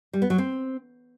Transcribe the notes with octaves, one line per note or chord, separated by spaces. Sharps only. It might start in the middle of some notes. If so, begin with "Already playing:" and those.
G3
B3
F#3
C4